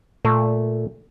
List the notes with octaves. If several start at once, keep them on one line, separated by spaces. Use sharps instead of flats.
A#2 A3